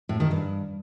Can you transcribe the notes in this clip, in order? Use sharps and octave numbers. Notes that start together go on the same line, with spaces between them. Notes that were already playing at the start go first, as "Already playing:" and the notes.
A2
D#3
G2